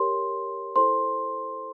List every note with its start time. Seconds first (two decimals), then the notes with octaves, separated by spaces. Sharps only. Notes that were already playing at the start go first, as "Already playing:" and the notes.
Already playing: G4 A#4 C#5 C6
0.76 E4 A4 C5 C6